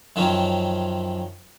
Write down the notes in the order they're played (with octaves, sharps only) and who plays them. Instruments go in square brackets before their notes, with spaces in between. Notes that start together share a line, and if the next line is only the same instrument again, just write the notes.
[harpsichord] F#2 D#3 F3 C4 C#4